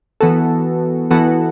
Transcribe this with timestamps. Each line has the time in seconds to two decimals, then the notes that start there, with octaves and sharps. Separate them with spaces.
0.21 E3 B3 F#4 A4
1.11 E3 B3 F#4 A4